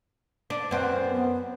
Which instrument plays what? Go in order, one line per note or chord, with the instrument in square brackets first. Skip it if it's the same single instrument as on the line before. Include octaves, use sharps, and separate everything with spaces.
[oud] D4
[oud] F#2 C4 [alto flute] B4
[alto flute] B3